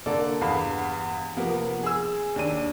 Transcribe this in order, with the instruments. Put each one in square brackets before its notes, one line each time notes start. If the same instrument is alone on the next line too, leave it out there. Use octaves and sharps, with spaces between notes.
[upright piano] D3 A#3 A4 D5
E2 G2 B3 F5 B5
C3 F3 A#3 B3
G#4 G#5 E6
D#2 D4 D#7